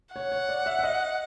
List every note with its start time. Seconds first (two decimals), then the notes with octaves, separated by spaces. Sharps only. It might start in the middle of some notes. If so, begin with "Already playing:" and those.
0.15 C#5 F#5
0.32 C#5
0.49 D5
0.66 E5
0.79 E5
0.84 D#5